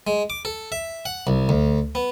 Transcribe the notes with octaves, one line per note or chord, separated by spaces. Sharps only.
G#3
D6
A4
E5
F#5
C2
D2
B3